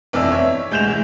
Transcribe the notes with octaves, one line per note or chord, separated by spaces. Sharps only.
G1 F2 E3 D5 E6
C#5 E5
D2 G#3 G6 E7 F7
E3 G#3